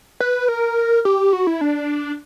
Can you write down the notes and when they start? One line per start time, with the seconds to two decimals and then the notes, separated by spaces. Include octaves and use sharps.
0.20 B4
0.48 A#4
1.05 G4
1.33 F#4
1.47 E4
1.61 D4